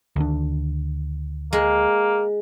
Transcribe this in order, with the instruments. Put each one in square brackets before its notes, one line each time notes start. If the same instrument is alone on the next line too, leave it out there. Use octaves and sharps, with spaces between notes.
[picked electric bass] D2 D#3 D4
[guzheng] G#3 [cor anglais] A#3